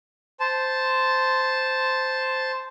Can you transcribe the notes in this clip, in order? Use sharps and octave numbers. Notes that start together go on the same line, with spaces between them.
C5 A5